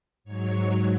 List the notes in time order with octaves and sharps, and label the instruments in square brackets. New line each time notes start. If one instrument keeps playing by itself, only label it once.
[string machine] G#2 F#3 C#5